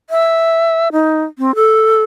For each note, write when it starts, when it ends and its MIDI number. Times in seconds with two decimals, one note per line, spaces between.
0.10 0.88 76
0.92 1.24 63
1.39 1.55 60
1.55 2.03 69